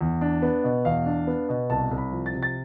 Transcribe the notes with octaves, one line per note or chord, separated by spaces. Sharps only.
E2
D4
B3
B2
E2 F5
D4
B3
B2
C2 A5
C2
B5
F3
A6
C3
A6